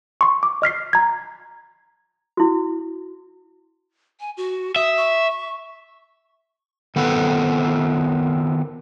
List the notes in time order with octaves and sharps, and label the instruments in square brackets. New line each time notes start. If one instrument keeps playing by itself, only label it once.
[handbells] C6 C#6
D6
D#5 F6 B6 C7
A#5 G#6
[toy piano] E4 F#4
[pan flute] G#5
F#4
[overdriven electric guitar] E5 [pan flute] D#6
[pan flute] C#6
[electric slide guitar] D#3 B3 C4 A4 B4